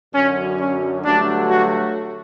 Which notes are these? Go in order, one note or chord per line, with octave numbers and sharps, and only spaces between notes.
F#2 D3 F#3 C#4
C#4
G2 D3 F#3 A3 D4
F#4